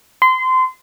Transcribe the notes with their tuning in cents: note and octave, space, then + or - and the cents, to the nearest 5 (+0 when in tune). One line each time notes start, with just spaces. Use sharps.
C6 -25